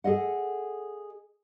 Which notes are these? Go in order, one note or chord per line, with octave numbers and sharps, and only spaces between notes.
G#4 A4 D#5 F#5